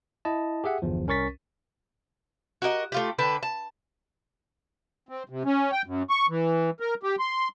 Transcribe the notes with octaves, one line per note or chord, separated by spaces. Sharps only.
E4 D#5 A5
G4 G#4 E5 F#5
G1 E2 F3
C2 C#4 A#4 C#6 A6 B6
F#4 G4 A#4 D#5
A3 F4 G4
D3 B4 G5 A5
A5
C4
C3
C#4
G5
F#2
C#6
E3
A#4
G4
C6